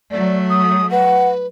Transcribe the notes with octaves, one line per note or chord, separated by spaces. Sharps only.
F#3 A3 D5
D#6
B4 F#5